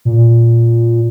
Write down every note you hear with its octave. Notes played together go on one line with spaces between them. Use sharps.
A#2